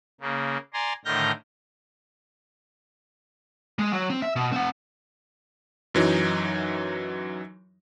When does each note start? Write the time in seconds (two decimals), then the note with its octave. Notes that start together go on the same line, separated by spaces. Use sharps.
0.21 C#3 A#3
0.74 D5 G#5 A#5 C6
1.05 A2 D3 D#3 F6 G6 A#6
3.79 G#3
3.93 F#3
4.10 C4
4.22 E5
4.36 B2
4.52 C4 F#5
5.95 F#2 E3 F#3 D#4